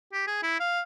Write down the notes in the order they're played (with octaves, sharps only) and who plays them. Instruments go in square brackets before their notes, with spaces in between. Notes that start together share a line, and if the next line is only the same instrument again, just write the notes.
[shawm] G4
G#4
E4
F5